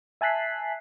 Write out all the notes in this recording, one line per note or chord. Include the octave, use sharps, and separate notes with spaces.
E5 G#5 A5 F#6 B6 C7